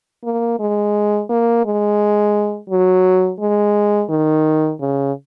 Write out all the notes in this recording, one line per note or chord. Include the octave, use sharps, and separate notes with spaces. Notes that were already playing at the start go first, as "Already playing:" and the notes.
A#3
G#3
A#3
G#3
F#3
G#3
D#3
C#3